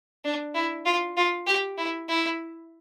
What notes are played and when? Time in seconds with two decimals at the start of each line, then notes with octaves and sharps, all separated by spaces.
0.25 D4
0.55 E4
0.86 F4
1.17 F4
1.47 G4
1.78 E4
2.09 E4